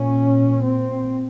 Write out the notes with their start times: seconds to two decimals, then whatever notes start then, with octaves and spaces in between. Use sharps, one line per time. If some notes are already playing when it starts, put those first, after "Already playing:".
Already playing: A#2 C#4
0.64 C4